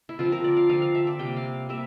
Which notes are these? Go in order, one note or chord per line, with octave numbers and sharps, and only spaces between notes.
E4
D3 F3 C4 F4
A#4
D5
F5
D3 F3 C4 F5
F5
E5
D5
C3 G3 A#3 G5
F5
C3 G3 A#3 E5